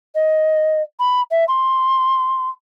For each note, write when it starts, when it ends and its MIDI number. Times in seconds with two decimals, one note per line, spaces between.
0.15 0.82 75
0.99 1.21 83
1.31 1.44 76
1.48 2.49 84